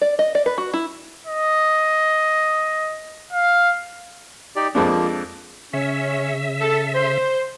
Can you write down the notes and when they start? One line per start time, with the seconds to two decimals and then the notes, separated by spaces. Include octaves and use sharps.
0.02 D5
0.19 D#5
0.35 D5
0.46 B4
0.58 F#4
0.73 E4
1.27 D#5
3.33 F5
4.56 D#4 G4 D5
4.75 F2 F3 G#3 A#3 D4
5.73 C#3 C#4 E5
6.61 A4
6.95 C5